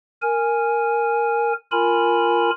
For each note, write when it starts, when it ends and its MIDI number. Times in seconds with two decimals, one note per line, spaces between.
0.22 1.53 70
0.22 1.53 80
1.72 2.50 65
1.72 2.50 70
1.72 2.50 80
1.72 2.50 83